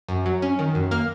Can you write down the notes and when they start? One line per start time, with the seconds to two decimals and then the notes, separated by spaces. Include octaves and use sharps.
0.08 F#2
0.26 F#3
0.42 C#4
0.59 D#3
0.75 F#2
0.91 A#3 F6